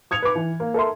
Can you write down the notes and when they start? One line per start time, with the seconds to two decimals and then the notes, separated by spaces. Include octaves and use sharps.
0.11 D#6 G#6 C#7 F7
0.22 B4 D6
0.35 E3
0.60 A#3
0.74 A4 A#4 E5 C6